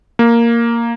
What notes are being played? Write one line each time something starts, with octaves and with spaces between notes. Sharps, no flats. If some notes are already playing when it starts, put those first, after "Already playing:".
A#3